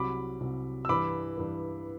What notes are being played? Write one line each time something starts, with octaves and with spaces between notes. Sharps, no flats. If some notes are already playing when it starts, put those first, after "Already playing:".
Already playing: C2 C3 F#3 B5 D6
C2 C3 F#3
E6
G2 E3 B5 D6
G2 E3